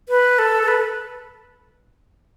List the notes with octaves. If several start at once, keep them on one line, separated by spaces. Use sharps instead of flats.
B4
A4
A4
B4